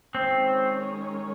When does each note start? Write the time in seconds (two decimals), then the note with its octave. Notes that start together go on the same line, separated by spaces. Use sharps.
0.14 D#3 G#3 C4 C#4 G#4 C#5